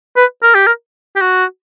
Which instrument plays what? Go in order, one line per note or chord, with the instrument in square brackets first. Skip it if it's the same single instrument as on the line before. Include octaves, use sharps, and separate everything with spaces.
[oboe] B4
A#4
G4
A#4
G4
F#4